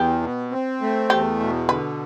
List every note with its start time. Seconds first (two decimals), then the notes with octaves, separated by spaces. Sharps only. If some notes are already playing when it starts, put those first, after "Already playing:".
Already playing: E2 G4
0.22 B2
0.52 C4
0.81 A3
1.10 E2 G4
1.40 B2
1.69 D3 B4